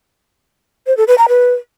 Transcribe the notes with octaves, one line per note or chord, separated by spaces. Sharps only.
C5
A4
B4
A#5
B4